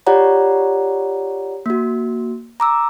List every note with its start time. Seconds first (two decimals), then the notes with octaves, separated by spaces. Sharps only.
0.06 F4 G4 C#5 D5 F#5 A#5
1.66 A#3 F#4
2.60 A#5 D6 E6